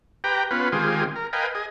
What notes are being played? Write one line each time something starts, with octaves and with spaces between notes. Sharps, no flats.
G4 B4 G5 A#5
B3 C#4 F4 B4
D#3 G#3 C4 F4 G4 G#4
A#4
A#4 B4 D#5 F5 G5 G#5
G#4 D#5